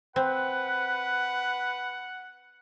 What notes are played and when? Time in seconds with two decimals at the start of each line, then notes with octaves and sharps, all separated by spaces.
0.16 C4 B4 F#5